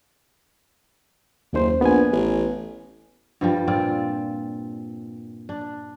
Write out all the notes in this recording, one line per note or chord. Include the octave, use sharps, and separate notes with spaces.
F#1 D#2 C5
A#1 B3 G#5
A1
G2 F3 G3
A#2 C4 F4 D5
D4